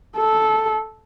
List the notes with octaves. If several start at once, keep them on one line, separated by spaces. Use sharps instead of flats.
A4